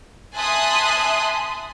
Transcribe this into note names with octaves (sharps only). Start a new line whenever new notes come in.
E5 G#5 A5 C6 D#6 F#6